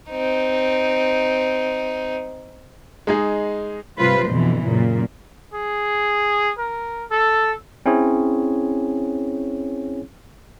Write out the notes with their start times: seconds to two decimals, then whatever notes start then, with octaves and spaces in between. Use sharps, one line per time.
0.11 C4 D#4
3.07 G#3 D#4 G#4
3.98 C3 G3 F4 B4 C5
4.28 F2 B2 D3 E3
4.65 F#2 A#2 C#3
5.54 G#4
6.58 A#4
7.11 A4
7.86 C4 C#4 E4 G#4 C#5